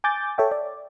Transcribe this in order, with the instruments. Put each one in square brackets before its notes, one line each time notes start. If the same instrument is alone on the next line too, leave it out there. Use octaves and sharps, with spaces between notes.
[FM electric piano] G#5 D6 G6 A6
A4 C#5 E5 G5
D5